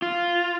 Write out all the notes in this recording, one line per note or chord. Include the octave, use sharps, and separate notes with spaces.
F4